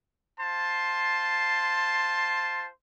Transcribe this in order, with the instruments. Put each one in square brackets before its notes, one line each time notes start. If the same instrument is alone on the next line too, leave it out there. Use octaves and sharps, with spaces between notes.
[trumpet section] F4 C5 A5 C6